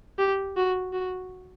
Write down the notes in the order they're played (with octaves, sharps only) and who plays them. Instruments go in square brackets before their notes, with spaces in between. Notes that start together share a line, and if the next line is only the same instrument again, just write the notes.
[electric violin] G4
F#4
F#4